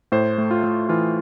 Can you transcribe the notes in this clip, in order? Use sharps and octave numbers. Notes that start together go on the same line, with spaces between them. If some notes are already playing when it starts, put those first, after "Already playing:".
A2 C5
A3
F4
A3
E3 F4